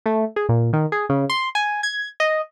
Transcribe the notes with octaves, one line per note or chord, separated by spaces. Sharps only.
A3
G#4
A#2
D#3
G#4
C#3
C6
G#5
G#6
D#5